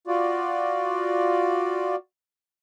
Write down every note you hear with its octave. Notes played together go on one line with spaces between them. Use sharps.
F4 F#4 D5